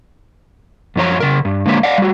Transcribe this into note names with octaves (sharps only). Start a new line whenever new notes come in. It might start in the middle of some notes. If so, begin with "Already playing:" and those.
F#2 F3 D4 C#5 A#5
C#3 A#4
G2
D3 G#3 A#3 B4 C#5
D5 F5 F#5
G3 F#4